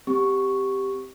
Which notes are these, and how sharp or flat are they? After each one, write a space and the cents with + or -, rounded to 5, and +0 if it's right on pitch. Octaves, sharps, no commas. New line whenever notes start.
C4 +0 G4 +0 C#6 +0